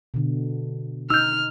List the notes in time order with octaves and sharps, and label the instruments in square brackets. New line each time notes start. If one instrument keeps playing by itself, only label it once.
[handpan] B2 D3
[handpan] D#4 [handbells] E6 G6 [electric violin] F6